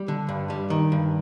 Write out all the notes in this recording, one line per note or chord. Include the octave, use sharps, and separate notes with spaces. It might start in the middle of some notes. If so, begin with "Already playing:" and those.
Already playing: G3
D3
G2
G3
D#3
G2